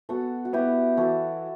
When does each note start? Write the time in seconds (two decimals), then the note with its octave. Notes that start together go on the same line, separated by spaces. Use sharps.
0.09 B3 F#4 A4
0.45 F#4
0.53 B3 E4 G4
0.97 E3 F#4 A4